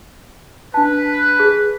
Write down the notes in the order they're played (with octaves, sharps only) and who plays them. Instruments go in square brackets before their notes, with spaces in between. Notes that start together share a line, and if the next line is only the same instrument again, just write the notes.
[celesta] D4 A5 [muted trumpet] B4
[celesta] G#4